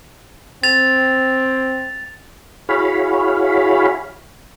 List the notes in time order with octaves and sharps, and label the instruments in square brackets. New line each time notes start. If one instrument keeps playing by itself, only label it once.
[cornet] C4 [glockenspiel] A6 F7
[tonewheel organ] E4 F#4 G#4 C#5 F5 B5